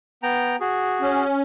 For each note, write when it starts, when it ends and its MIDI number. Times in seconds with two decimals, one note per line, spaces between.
0.23 0.56 59
0.23 0.56 79
0.23 0.56 82
0.60 1.24 66
0.60 1.24 68
1.01 1.43 61